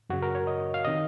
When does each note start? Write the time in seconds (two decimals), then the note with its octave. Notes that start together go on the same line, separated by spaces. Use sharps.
0.09 F#2 C#3 F#4
0.22 A#4
0.35 C#5
0.47 D#5
0.74 F5
0.85 C3 D#3 D#5